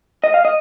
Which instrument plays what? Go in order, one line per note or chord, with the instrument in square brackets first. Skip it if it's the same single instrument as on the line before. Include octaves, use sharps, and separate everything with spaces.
[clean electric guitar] D#5
F5
D#5